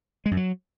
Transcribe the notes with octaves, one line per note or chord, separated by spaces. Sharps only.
G#3
F#2
F#3